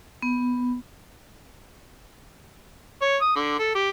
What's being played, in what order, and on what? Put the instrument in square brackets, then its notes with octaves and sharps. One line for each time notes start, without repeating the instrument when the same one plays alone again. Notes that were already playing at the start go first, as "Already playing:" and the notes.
[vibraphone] B3
[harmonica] C#5
D#6
D3
A4
G4